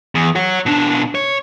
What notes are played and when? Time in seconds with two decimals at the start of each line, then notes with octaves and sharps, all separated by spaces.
0.15 E2
0.36 C#5 F#5
0.66 B2 D4
1.15 C#5